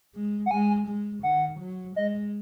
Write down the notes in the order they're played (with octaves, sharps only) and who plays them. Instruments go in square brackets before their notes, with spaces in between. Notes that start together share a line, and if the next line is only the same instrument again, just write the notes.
[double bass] G#3
[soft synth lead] F#5
[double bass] G#3 [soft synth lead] G#5
[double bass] G#3
[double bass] D#3 [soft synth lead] F#5
[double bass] F#3
[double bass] G#3 [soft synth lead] D#5